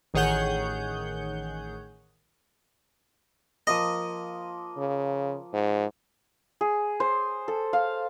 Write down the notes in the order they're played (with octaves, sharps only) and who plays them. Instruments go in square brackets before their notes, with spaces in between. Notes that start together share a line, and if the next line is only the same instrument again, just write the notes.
[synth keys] A1 D#3 G#4 C#5 F#5 G6
[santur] F3 A#3 D#6 [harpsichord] D#5
[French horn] C#3
G#2
[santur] G#4
C5
A4
F5